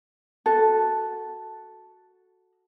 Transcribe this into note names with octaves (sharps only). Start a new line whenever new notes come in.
F#4 A4